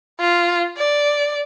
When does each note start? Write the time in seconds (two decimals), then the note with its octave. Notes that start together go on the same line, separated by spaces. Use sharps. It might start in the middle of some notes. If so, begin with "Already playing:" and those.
0.20 F4
0.77 D5